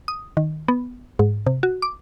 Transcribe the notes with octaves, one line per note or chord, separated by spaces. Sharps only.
D#6
D#3
B3
G#2
C3
F#4
D6